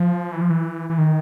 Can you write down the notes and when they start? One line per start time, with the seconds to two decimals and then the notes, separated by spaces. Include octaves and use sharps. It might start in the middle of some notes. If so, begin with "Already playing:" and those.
Already playing: F3
0.32 E3
0.41 F3
0.50 E3
0.90 E3
0.98 D#3